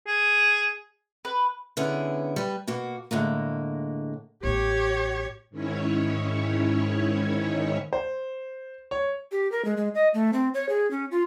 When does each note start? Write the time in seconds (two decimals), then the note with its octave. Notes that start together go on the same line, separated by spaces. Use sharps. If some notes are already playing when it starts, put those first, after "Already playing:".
0.07 G#4
1.25 B4
1.77 D3 B3 C#4 E4 G#4
2.36 G3 B4
2.67 B2 A#3 F#4
3.11 A2 D3 G#3 A#3
4.43 A1 B3 G4 C#5
5.50 G#2 D#3 C#4 E4 C#5
7.93 C5
8.91 C#5
9.32 G4
9.52 A#4
9.65 G#3
9.77 G#3
9.95 D#5
10.14 A3
10.33 C4
10.54 C#5
10.69 G#4
10.91 C#4
11.11 F4